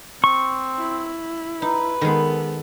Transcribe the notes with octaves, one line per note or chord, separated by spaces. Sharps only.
C4 C#6
E4
D#4 B4
D#3 G#3 B3 A4